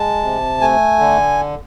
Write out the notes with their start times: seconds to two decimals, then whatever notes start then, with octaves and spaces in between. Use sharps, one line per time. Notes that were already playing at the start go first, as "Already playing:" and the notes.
Already playing: G#3 A5
0.23 C3
0.61 A3 G#5
0.99 D3